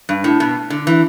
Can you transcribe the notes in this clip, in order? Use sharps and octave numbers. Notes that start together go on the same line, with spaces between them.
G2
A2
B2
D3
E3